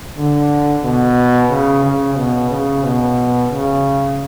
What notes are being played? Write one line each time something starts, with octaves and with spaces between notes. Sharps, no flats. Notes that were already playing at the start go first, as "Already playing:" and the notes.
D3
B2
C#3
C#3
B2
C#3
B2
C#3